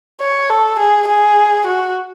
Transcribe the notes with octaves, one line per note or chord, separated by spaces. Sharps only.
C#5
A4
G#4
G#4
F#4